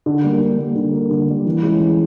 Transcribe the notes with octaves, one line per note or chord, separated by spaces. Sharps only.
D3
G3 A#3
D3
G3 A#3
D3
G3 A#3
D3
G3 A#3
E3
G#3 C#4 E4
E3